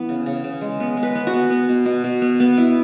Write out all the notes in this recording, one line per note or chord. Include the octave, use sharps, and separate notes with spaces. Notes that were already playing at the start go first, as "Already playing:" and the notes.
Already playing: E3 B3
C#3
C#3
C#3
G#3
B3
G#3
B4
B3
F#4
B3
B3
B2
B2
B2
B3
B3
E4